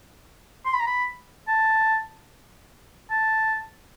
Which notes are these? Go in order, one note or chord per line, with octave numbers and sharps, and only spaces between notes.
C6
B5
A#5
B5
A5
A5